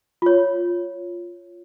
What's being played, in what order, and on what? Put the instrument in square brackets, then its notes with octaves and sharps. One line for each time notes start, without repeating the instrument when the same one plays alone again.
[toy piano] F4 C#5